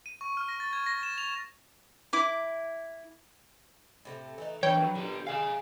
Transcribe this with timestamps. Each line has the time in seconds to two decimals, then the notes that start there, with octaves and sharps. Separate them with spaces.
0.06 D#7
0.21 C#6
0.37 F6
0.48 A#6
0.60 A6
0.73 G#6
0.86 A#6
1.03 E7
1.18 F7
2.13 E4 D6
4.05 A2 C3 A3
4.38 E3 A3 D#4
4.63 D3 E3 D4 G4 B4 C#5 G5
4.81 F#3
4.96 A#2 D3 G4
5.27 G#3 G#4 F5 G#5